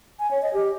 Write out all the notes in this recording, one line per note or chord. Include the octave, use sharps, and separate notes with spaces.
G#5
C#5
D#5
G4